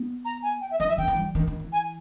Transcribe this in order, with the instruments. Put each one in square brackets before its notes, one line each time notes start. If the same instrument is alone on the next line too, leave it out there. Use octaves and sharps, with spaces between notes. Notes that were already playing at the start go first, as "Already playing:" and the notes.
Already playing: [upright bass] B3
[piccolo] A#5
G#5
G5
E5
[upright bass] E3 [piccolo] D#5
[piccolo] E5
[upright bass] D#3 [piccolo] G5
[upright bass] E3
G3
D#3
D#3
E3
[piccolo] G#5